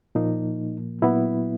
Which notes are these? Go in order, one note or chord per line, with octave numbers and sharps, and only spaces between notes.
A#2 F3 A#3 D#4
A#2 F#3 B3 E4